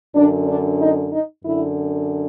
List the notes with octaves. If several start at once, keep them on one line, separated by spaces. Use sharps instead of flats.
F#2 D3 D4
D4
D#4
D#4
F#2 D3 E4